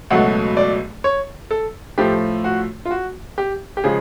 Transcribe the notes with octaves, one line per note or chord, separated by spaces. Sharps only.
C#2 B2 F#3 A3 F#5
D5
C#5
A4
A2 F3 A3 G4
F#4
F4
F#4
G4
G4
C#3 F3 G#3 G#4